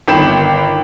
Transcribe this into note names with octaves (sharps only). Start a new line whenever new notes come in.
G1 D#3 G5 B5 E7